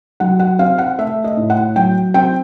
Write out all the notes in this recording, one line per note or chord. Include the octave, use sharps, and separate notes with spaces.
F#3 F#5
F#5
C4 F5
F#5
A3 E5
D#5
A2
F#5
F#3 G5
C4 G5